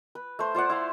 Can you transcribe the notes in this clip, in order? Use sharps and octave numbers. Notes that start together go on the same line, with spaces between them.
B4
A3 C5
F4 C5 D5 F#5
E4 F5 C6